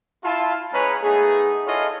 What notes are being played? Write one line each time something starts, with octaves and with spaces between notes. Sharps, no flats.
E4 F4 A5
G#3 C#4 G#4 B4 C#5 A#5
A3 B3 D#4 G#4
E4 F4 G#4 A4 C#5 D#5